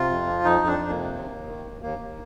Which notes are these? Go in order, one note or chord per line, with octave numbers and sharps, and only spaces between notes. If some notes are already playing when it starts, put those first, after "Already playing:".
Already playing: C3 F4
F2
F3
F2 D#4
F2
D4
F2
A#3
C3
D#2
D#2
D#3
D#2
D#2 A#3
D#2